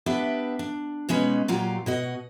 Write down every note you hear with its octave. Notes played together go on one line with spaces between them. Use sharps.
B3 D4 G4 B4 E5
D4
B2 G#3 C#4 D#4 B4
A#2 F#3 F4 G4
B2 F#4 D#5